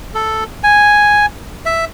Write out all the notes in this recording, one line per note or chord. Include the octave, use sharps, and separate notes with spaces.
A4
G#5
E5